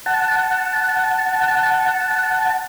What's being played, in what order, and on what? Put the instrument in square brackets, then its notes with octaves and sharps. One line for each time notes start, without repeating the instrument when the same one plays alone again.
[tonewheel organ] F#5 A5